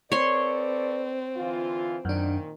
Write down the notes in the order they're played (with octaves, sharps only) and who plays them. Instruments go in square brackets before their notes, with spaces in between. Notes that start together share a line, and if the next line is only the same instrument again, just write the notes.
[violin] C4 [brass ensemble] A4 B4 D5 [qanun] C#5 C6
[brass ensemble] D3 E3 F4
[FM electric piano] F#2 D4 [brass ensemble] A#2 D#3